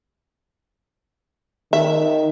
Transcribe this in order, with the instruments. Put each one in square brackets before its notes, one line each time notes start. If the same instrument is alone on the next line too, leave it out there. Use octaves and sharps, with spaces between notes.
[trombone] D#3 [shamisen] E5